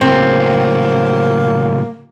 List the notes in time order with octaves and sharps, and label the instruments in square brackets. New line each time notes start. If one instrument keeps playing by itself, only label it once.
[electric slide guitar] A2 C#3 F#3 [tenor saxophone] A#3 [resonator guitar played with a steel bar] C4